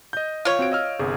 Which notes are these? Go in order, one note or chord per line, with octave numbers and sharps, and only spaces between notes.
D#5 G6
F4 C#5
C4 F#4 D7
D#5 E6 F6
G1 C2 G#4